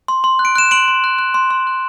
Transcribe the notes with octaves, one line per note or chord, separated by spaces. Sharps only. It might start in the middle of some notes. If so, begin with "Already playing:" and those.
C6
C6
F#6
D7
F#6 E7
C6 D7 F#7
C6
F#6
F#6
C6
C6
F#6